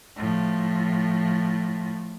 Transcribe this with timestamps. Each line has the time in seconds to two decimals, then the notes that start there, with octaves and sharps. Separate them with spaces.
0.16 A2 F3